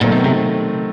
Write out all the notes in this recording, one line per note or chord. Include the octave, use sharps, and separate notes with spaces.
A#2 D#3 F#3 A3 C4
B2
C3